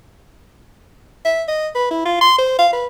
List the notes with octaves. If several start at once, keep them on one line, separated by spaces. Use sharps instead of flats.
E5
D#5
B4
E4
F4
C6
C5
F5
B4